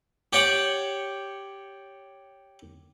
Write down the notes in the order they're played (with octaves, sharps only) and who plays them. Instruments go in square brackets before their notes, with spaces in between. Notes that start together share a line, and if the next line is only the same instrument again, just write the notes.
[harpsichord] G4 C#5 D5 F#5